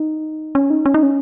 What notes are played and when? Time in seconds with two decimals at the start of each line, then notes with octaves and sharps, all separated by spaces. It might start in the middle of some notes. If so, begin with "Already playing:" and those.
Already playing: D#4
0.55 C#4
0.70 D#4
0.86 C#4
0.94 D#4
1.03 C#4